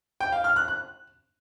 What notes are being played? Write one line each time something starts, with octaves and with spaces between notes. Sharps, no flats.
G5
F5
F6
F#6
F#6